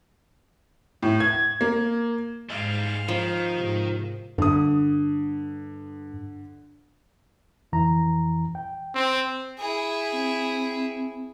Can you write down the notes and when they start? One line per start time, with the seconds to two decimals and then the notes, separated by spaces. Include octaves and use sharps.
1.03 A2
1.20 G#6
1.61 A#3
2.49 G#2 G3 G#3 F5
3.08 D#3 F3
3.53 G#2 C3
4.38 G2 D3 D#6
7.72 F2 E3 A#5
8.55 G5
8.95 C4
9.59 E4 G#4
10.12 C4